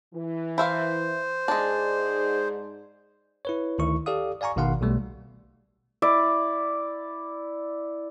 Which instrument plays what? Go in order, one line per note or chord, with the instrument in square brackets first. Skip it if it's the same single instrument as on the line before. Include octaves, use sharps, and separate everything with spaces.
[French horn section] E3
[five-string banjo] E4 E5 F5 [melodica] C5
[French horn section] G#2 G#4 D5 [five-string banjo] G#3 D4
[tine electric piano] E4 B4 C#5
D2 D#3 E4 C#6
G4 A4 D5 F5 D#6
D5 F5 G#5 A#5 C#6
G#1 B2 D#3 F5 F#5 C6
B1 B2 G3 A3
[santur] E4 D5